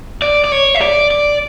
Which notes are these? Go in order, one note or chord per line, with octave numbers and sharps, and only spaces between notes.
D5
D5
C#5
E5
D5
D5